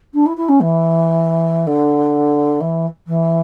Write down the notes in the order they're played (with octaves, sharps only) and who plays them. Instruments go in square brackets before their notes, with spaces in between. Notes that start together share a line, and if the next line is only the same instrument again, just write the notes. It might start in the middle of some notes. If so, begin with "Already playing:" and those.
[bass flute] D4
E4
E4
C#4
E3
D3
E3
E3